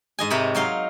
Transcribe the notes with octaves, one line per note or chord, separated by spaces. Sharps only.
G#2 D#5 G#5
G#2 C3 D#4 A#4 C#5 B5
F#3 D#4 F5 C6